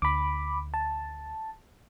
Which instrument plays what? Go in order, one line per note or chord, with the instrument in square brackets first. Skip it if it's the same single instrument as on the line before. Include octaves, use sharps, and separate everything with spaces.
[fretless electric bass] D2 [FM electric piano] B5 D6
[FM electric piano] A5